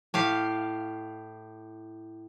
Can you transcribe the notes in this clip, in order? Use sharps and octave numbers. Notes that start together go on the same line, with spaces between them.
A2 G4 F5